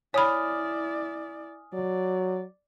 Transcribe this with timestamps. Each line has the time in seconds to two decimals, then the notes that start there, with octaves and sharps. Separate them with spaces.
0.14 E4 C#5 D5 G#5 B5 D#6 F6
1.74 F#3 D5